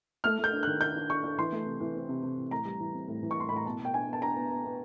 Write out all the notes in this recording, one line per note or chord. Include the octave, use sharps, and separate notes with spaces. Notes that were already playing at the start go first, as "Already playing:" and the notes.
A3 F6
A3
G6
D4
D#3 F#6
D4 G6
D4
D4 C#6
D4
E3 C6
A3
C3
E3
C4
C3
C3
E3
A2 A#5
G3
E3
C4
A2
E3
C#6
A2 C6
A2 B5
A#5
B2 A5
B2 G5
D4 G#5
B3
A5
D4 A#5
B3
B3
B3